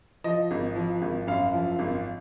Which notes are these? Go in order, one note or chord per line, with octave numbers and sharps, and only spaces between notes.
F3 D#5
G#1
F3
G#1
F#2 F5
F3
G#1